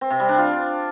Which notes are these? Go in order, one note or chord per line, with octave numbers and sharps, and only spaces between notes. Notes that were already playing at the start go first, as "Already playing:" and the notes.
C4
C3
G3
D4
F4